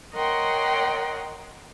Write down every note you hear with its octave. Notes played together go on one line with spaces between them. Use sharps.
A#4 C#5 D#5 F#5 G5 C6